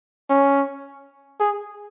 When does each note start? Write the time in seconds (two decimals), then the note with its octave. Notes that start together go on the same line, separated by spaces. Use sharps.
0.30 C#4
1.40 G#4